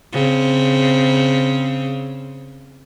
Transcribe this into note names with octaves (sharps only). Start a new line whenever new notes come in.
C#3 C4